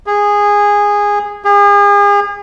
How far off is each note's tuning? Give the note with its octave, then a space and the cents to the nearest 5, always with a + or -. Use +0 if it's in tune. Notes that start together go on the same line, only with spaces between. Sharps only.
G#4 -15
G#4 -40